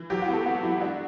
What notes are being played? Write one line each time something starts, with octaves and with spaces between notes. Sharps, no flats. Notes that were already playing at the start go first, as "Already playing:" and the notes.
Already playing: E3
F#3 G4
F#4
B3 A4
B3 F#4
F#3 E4
D4 F#4